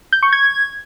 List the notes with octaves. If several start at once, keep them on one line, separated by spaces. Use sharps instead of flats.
G6
C#6
G#6